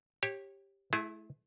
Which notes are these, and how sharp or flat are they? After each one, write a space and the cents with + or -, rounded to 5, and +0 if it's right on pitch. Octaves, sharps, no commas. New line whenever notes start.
G4 +0 C#5 -25
A3 -40 E4 +0 G#4 +0